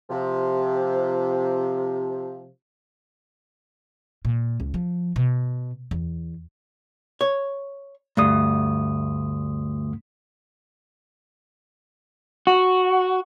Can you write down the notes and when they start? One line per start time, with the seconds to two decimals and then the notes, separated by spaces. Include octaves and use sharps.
0.09 C3 F3
4.25 A#2
4.60 C#2
4.74 F3
5.16 B2
5.91 E2
7.21 C#5
8.17 D2 G2 A3 D#6
12.47 F#4